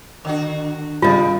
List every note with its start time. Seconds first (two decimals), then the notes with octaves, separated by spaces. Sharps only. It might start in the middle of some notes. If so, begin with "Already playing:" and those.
0.25 D3 D#3 D4 F#4
1.02 A#2 C#3 G3 F4 D#5